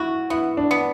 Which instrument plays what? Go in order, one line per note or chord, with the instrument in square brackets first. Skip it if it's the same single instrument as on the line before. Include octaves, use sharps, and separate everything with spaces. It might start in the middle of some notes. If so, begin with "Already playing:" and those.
Already playing: [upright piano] E4 [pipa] F#4
[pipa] B3 [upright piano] E4
[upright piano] D4
[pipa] B3